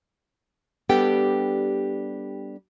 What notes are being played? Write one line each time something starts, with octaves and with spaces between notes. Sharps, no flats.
G3 B3 D4 G4 A4 G5